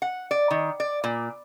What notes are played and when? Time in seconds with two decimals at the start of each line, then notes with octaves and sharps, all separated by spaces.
0.02 F#5
0.31 D5
0.51 D#3
0.80 D5
1.04 A#2